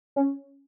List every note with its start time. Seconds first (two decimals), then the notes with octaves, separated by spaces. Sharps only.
0.16 C#4